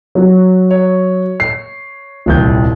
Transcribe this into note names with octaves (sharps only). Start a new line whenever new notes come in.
F#3 F#4
C#5
C7
D#1 C2 G6